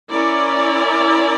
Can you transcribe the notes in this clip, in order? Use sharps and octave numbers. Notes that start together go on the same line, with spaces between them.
C#4 E4 A#4 D5